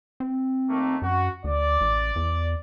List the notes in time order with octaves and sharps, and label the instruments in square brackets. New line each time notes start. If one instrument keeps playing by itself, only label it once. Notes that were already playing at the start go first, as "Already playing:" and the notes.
[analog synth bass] C4
[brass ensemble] D#2 A3 A#3
[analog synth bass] F#2 [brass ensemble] F#4
[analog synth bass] D2 [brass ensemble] D5
[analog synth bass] A1
E2